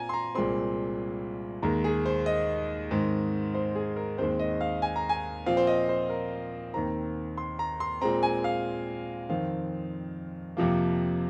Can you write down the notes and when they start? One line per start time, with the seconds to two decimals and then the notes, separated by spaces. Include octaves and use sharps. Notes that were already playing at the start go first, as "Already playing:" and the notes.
Already playing: A#2 C4 G#5 A#5
0.09 C6
0.14 A#5
0.35 C2 A#2 G#3 C4 C6
1.63 D#2 D#3 G#3 A#5
1.84 G#4
2.06 C5
2.26 D#5
2.91 G#2 D#3 C4
3.55 C5
3.75 G#4
3.96 A#4
4.18 D#2 D#3 G#3 C4 C5
4.39 D#5
4.61 F5
4.82 G#5
4.96 A#5
5.09 G#5
5.46 A#2 F3 C4 F5
5.57 C5
5.67 D#5
5.89 C5
6.10 A#4
6.74 D#2 D#3 C4 A#5
7.38 C6
7.59 A#5
7.80 C6
8.02 A#2 G#3 C4 A#5
8.23 G#5
8.44 F5
9.29 F2 D#3 C4 F5
10.57 F2 C3 F3 A#3